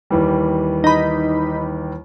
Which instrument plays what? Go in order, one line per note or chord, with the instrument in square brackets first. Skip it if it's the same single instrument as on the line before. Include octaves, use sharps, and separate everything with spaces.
[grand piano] D#2 E3 G3
[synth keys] D#4 B5